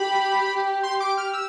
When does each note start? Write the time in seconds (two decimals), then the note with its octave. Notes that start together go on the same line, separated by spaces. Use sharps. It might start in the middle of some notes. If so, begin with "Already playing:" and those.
Already playing: G4 B5
0.83 C6
1.00 D6
1.17 F6
1.33 E6